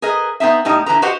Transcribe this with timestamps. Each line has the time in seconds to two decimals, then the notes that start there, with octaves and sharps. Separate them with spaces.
0.02 G#4 A#4 B4 D#5
0.40 B3 C4 D#4 E5
0.65 A2 G3 D#4 D#5
0.86 D3 E3 B4 A#5
1.02 F#4 G4 B4 C5 D#5 F#5